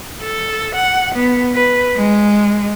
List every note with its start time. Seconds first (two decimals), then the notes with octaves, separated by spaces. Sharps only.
0.23 A4
0.75 F#5
1.15 B3
1.54 B4
1.96 G#3